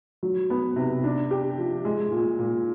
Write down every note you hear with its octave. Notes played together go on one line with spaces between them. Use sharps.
F#3
B3
C3
D4
G4
F3
G#3
A#2
A#2